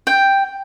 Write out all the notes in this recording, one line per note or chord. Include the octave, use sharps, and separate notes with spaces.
G5